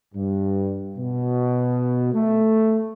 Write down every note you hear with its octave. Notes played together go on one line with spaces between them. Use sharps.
G2
B2
A3